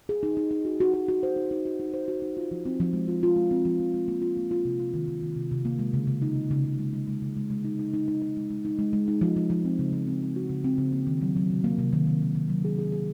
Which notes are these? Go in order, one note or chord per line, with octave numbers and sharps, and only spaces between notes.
G#4
D#4
D#4
D#4
F#4
F#4
F#4
F#4
C5
D#4
D#4
F#4
D#4
C5
F#4
D#4
F4
F3
C4
F3
G#3
F4
F4
G#3
C4
F3
F3
G#3
A#3
F4
A#3
F4
C3
F4
D#3
D#3
D#3
C3
C3
A#3
G#3
C#3
C#3
D#4
C#3
C#3
C#3
G#3
G#3
G#3
C#3
G#3
G#3
D#4
D#4
D#4
D#4
D#4
G#3
G#3
D#4
G#3
G#3
D#4
F3
F3
F3
C4
C#3
F3
C4
C4
F#4
C#3
C4
C#3
A#3
D#3
F#3
F#3
C3
A#3
C3
D#3
D#3
D#3
D#3
F#3
G#4
G#4
G#4